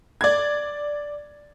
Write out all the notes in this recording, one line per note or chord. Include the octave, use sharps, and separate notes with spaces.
D5 G#6